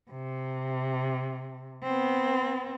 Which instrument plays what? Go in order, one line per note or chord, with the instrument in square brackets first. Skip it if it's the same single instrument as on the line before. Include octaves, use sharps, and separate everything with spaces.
[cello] C3
B3 C4